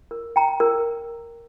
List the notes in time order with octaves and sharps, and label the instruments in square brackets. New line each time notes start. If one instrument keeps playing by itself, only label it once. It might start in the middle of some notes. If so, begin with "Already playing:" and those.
[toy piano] A#4
G5 A#5
A#4